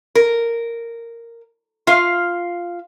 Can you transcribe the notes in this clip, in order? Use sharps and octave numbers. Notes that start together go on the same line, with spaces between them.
A#4
F4 F5